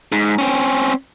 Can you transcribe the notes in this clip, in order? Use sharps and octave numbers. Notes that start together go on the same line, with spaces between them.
G#2
C4 C#4